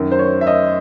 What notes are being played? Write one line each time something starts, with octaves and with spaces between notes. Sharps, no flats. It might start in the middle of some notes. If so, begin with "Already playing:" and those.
Already playing: F#2 D#3
C5
C#5
E5
D#5